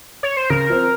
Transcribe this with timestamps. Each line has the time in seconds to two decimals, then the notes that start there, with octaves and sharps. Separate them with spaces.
0.23 C#5
0.37 C5
0.50 C#3 A#4
0.70 F3 C4